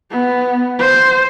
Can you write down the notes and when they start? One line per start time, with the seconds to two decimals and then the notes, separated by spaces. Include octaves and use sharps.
0.11 B3
0.79 C5